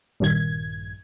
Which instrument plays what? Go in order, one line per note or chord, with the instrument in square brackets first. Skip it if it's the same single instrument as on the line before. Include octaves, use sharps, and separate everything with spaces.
[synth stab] A#1 G2 D#3 G#6